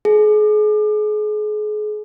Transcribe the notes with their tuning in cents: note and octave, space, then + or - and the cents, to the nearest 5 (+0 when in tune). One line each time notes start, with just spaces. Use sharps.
G#4 +35